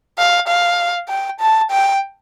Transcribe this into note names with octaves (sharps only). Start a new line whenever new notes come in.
F5
F5
G5
A5
G5